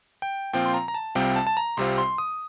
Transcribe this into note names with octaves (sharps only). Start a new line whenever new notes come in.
G5
A#2 F3 C4 F4 G5
C6
A#5
A#5
A5
C2 C3 G3 C4 F4 G5
A5
A5
A#5
C2 C3 G3 C4 F4 C6
C6
D#6